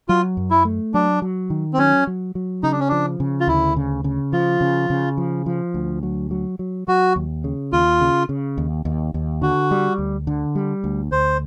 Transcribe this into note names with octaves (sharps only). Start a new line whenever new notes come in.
F#3 F4
F#2
E4
A3
F#3 D4
F#3
D#3
C4
F#3 C#4
F#3
F#3
C#3 D#4
D4
C#4
F3 D4
C#3
F4
D2 E4
C#3
C#3
F3 F4
C#3
C#3
F3
F3
D2
F#3
F#3
F#3
F#3 F#4
D#2
C#3
D#2 F4
C#3
C#3
D#2
D#2
D#2
D3 F#4
G3
D2
D3
G3
D2
D2 C5